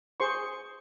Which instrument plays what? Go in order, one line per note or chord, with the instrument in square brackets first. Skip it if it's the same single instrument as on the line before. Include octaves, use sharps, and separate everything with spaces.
[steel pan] G#4 C5 C6 C#6